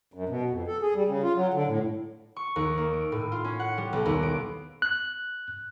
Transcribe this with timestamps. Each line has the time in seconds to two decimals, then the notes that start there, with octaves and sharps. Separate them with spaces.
0.14 F#2
0.29 B2
0.50 F2
0.67 A4
0.82 G#4
0.95 G3
1.08 C#3
1.23 F4
1.35 F#3
1.54 D3
1.67 A2
2.36 C#6
2.56 D#2
2.78 A#3
2.94 D7
3.12 A2
3.32 F4
3.45 C#4
3.59 F#5
3.78 G3
3.93 B1
4.06 D#2
4.23 D7
4.82 F#6